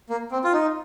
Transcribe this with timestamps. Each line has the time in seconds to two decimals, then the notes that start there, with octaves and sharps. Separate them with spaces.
0.10 A#3
0.32 C4
0.44 F4
0.53 D#4